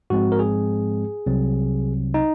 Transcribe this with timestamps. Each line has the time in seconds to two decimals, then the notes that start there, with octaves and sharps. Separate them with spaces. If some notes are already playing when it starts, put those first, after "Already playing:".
0.10 G#2 F3 G#3 C4 F#4
0.32 A#4
0.39 G#4
1.26 C2 C3 F#3 C4
2.14 D#4